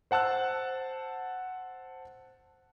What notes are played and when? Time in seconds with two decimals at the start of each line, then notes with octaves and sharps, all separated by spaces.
0.11 C5 F#5 A5 E6 F#6